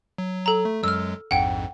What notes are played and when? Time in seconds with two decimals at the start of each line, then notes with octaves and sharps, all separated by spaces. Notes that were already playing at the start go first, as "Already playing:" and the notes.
0.18 F#3
0.46 A4 A#5
0.65 A3
0.84 F#2 F#3 G#3 E6 F6
1.31 A#1 F2 G#2 F#5 G5